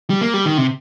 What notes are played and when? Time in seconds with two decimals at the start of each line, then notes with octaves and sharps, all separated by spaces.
0.10 G3
0.21 A#3
0.34 G3
0.46 D#3
0.58 C3